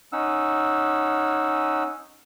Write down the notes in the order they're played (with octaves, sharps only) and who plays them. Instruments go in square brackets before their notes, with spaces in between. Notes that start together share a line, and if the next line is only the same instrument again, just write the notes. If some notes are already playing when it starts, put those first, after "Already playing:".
[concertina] C#4 D#4 F#5 E6